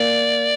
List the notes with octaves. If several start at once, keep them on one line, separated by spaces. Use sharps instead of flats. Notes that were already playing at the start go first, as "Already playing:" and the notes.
Already playing: A#3 D5